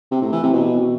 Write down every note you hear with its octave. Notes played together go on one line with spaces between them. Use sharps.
C3
A2
E3
C3
B2